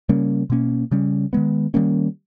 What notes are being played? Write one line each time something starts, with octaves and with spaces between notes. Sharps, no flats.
C#3 G3 A#3 C#4
B2 A#3 C#4
C#3 G3 C#4
D#3 G#3 B3
D#3 G3 A#3 C#4